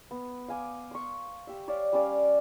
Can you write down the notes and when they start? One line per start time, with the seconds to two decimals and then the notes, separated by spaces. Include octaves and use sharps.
0.11 B3
0.48 F5 G#5 D6 D#6
0.91 C6 C#6
1.47 G4 E5
1.68 C#5 D5 F5
1.93 G3 C#4 D5 F5